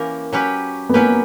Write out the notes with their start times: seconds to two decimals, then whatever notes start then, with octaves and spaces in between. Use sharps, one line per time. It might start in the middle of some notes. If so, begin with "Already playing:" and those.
Already playing: E3 A#3 C#4 G4 A#4
0.33 F#3 C#4 G4 B4
0.89 B3
0.94 F#3 A#3 C#4 G4 B4